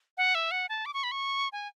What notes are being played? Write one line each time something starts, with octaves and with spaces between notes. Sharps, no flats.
F#5
E5
F#5
A5
D6
C#6
B5
C#6
G#5